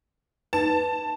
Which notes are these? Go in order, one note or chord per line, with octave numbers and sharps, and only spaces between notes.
D#4 B4 A5